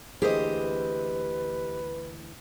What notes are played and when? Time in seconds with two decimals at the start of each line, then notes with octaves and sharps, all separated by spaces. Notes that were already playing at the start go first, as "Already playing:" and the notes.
0.22 D2 E3 A#3 G4 G#4 B4 C5 D#5